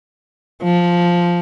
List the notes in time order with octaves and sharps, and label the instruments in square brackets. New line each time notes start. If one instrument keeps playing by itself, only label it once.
[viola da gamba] F3